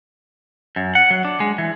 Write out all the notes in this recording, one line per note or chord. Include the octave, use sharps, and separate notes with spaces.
F#2
F#5
F#3
D4
G#3
E3